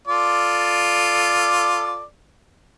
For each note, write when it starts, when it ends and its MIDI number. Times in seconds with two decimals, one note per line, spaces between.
0.07 2.03 65
0.07 2.03 69
0.07 2.03 74